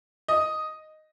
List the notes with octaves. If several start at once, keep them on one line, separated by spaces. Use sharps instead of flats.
D#5